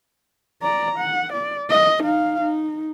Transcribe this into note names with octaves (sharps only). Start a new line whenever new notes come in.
D5 A#5
F#5
D5
D#5
D#4 F5
D#4